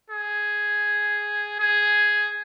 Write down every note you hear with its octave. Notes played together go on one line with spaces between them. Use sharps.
G#4
G#4